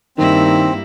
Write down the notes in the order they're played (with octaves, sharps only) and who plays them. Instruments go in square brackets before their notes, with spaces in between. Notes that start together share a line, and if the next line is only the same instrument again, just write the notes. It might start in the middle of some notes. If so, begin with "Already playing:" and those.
[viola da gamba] G2 A#3 E4 [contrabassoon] D#3 [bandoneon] C4